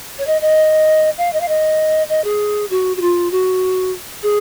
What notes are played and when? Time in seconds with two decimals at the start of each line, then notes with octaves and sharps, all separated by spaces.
0.17 C#5
0.26 D#5
0.41 D#5
1.17 F5
1.32 D#5
1.40 F5
1.48 D#5
2.09 D#5
2.24 G#4
2.70 F#4
2.96 F#4
3.00 F4
3.31 F#4
4.22 G#4